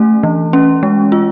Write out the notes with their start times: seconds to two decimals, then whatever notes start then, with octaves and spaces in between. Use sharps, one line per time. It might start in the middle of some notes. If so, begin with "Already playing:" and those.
Already playing: A3 C#4
0.23 E3
0.53 C#4
0.83 G#3
1.12 F4